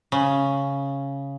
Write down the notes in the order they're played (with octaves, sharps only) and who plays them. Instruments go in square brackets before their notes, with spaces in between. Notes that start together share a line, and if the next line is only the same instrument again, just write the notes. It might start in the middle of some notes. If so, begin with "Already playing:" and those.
[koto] C#3